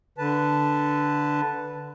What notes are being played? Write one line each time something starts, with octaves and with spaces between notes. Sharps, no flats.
D3 B4 A5